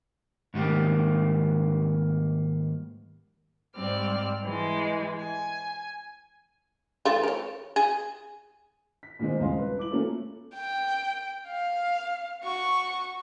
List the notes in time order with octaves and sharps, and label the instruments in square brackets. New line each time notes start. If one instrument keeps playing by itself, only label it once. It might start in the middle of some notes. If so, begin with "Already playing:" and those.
[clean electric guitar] G#2 D#3 G3 A#3
[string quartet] G#2 G3 C4 D5 F6
E3 G#3
G#5
[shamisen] E3 A3 F4
A#4 C#5
G#4
[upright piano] B6
A#2 D#3 G#3 C4
D#1 C#3 G#3 C#4 F5 C6
B4
E4 D6 F#7
A3 A#3 C#4 F4 F#4 A4
[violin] G5
F5
F#4 C#6